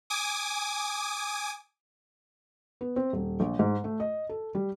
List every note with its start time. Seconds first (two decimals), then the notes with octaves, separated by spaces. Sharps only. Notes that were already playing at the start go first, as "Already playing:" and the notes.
0.10 G#5 D6 D#6
2.81 B3
2.96 C4
3.13 D#1
3.40 A#1
3.59 G#2
3.84 A3
4.00 D#5
4.29 A4
4.55 G3